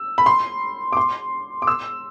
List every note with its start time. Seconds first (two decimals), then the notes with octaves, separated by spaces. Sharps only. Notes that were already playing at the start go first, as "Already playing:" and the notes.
Already playing: E6
0.18 B5
0.26 C6
0.92 D6
0.97 C6
1.62 D6
1.67 E6